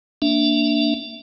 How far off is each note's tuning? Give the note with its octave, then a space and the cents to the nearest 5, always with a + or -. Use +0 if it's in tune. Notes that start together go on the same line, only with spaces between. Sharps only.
A#3 -20 D4 -5 E5 +5